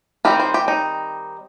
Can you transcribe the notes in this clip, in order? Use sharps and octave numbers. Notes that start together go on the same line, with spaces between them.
D#3 G3 C4 D#4 G4
C5
G4
D#4